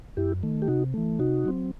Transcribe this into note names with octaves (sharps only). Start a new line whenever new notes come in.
F#2 E4 G4
D#3 A3
G4
C3 D#4 F#4
E3 A3
C3 D#4 F#4
F#3 C4